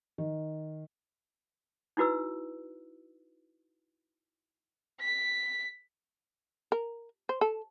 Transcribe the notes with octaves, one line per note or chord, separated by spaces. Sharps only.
D#3
D#4 E4 F#4 B4 E6
B6
A#4
C5
A4